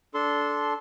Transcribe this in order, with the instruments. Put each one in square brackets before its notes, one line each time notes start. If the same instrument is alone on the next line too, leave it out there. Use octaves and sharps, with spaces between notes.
[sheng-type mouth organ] D4 A4 C6